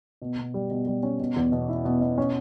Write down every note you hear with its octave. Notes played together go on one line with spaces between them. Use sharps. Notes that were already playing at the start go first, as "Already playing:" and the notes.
B2
B2
G3
B2
G3
C#4
B2
E2
B2
E4
B2
B2
C#4